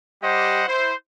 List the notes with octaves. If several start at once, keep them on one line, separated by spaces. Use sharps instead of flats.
G3 G4 C5 D#5 F#5
E4 C5